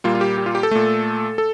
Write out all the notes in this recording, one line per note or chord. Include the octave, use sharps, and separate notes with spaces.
A#2 G3 A#3 F4
F4
G4
G4
F4
G4
A4
A#2 A3
A4